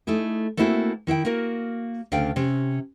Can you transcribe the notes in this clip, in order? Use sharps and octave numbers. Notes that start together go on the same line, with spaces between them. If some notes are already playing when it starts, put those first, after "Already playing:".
A3 D#4 E4 G#4
A3 A#3 C4 E4 F#4 G#4
D#3 E4 F5 G5
A#3 F#4 A#4
D2 C#3 D4 F5 G5
C3 C#4